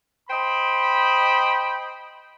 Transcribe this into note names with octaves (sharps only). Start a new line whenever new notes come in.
C5 D#5 G5 B5